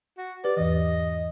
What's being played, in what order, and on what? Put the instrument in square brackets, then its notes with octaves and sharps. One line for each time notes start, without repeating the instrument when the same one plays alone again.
[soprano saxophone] F#4
[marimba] G4 B4 [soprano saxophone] D5
[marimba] E2 G#2 E3 [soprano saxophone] D#5